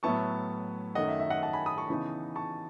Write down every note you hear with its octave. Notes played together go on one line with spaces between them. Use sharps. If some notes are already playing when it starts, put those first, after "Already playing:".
A2 F#3 B3 E4 A5 C#6
F#2 D#3 A3 D#5 F#5
E5
E5
D#5 F#5
F#5 A5
G#5 B5
B5 D#6
A5 C#6
C#3 E3 B3 D#4
A5 C#6